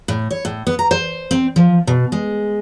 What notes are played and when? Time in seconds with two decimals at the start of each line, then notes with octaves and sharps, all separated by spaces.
0.08 A2
0.31 C#5
0.45 A2
0.67 B3
0.79 A#5
0.91 C5
1.31 C4
1.56 F3
1.87 B2
2.12 G#3